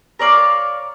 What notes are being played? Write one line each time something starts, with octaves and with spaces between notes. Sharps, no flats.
A#4 C#5 D5 F5